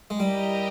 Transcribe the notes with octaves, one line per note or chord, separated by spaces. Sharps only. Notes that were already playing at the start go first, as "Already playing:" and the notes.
G#3
G3 E4 G4 A#4 D#5 G5